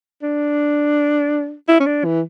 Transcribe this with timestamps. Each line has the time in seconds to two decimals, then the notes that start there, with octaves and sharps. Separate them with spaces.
0.22 D4
1.68 E4
1.80 C#4
1.87 D4
2.05 E3